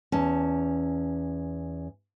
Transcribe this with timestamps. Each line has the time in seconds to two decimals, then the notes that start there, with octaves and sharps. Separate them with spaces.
0.12 E2 C#4 A5